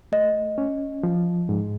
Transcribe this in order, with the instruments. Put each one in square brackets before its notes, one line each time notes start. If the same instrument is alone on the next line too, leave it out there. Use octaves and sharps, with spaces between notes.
[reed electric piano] A3 [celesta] D#5
[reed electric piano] C#4
F3
G#2